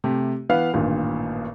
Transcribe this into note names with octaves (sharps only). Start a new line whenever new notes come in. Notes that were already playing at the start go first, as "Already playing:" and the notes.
C3 A3 G4
E3 B3 B4 F5
A1 G2 A#2 D#3